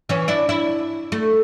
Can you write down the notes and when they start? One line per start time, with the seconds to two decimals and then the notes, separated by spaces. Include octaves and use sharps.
0.09 E3 C#4
0.28 D4 E4
0.49 E4
1.12 A3